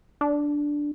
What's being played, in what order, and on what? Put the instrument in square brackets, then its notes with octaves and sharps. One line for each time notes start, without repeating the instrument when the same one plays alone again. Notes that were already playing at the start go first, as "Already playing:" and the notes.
[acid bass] D4